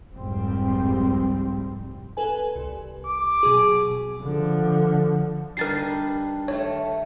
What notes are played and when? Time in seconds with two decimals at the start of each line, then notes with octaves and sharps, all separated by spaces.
0.14 F1 C2 G#2 F3 G3 C4
2.17 A4 B4 G#5
2.55 C2
3.06 D6
3.43 B2 F#3 G#4
4.22 D3 F3
5.57 G3 D4 D#4 A#4 A6 C7
5.77 B4
6.48 D#3 A3 C#5